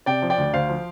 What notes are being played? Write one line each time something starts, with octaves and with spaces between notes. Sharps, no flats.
C3 D5 G5
F3
D5 G5
D2
D2 C5 F5
F3